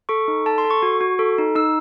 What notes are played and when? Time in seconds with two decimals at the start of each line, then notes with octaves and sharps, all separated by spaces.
0.09 A4 C#6
0.28 D#4
0.46 A4 A5
0.58 C6
0.65 A4
0.70 C#6
0.83 F#4
1.01 F#4
1.19 A4
1.38 D#4
1.56 D#4 E6